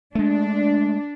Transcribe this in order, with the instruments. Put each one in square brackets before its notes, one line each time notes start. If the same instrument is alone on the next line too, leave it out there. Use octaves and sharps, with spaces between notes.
[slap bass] G#3 A3 [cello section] D4